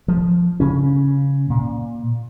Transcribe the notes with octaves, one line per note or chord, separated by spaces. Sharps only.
F3
C#3 C#4
A#2